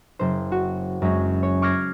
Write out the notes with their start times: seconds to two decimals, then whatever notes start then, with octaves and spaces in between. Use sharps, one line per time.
0.19 F#1 C5
0.52 F#4
1.02 F#2 G#3 C#4
1.43 C#5
1.62 C#6 D6 F6 G#6 A#6 C7